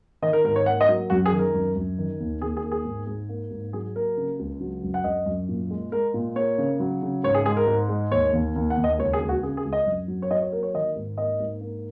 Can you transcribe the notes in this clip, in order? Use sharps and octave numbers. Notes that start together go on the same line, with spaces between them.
D#3 D#5
A#4
G#2 A#4
C#5
A#3 F#5
D#5
F#3
F#2 F#4
G#4
D#3
A#4
F#2
F#2
D#3
D#2
D#2 G#4
G#4
A#3
G#4
G#2
G#2
A#3
G#2
F#3 G#4
A#3 A#4
C#3
C#2
F#3
F#2
F#5
F#2 D#5
F#2
A#2
G#3
G#3 A#4
A#2
A#3 C#5
C#3
F#3
C#3
G#2 C#5
G#4
G#3 G#4
A#4
G#2
G#3
D#2 C#5
D#2
D#2
F#5
D#2
D#5
C#2 C#5
G#4
C#2
F#4
C#3 G#4
G#4
C#2
D#5
F#2
F#3
C#5
F#3 D#5
C#5
A#3 A#4
C#5
D#3 D#5
G#2
A#3 D#5
G#2
A#3